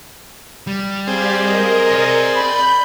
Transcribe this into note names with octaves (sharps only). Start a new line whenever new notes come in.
G3
C4 G4 G#4 D5 F5
A#4 D#5
D5 C6
B5 G6